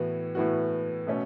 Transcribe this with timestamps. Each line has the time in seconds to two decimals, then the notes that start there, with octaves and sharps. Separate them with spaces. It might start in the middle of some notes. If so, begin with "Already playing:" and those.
Already playing: A2 E3 B3 F#4
0.35 A2 E3 B3 F#4
1.07 B2 A3 C#4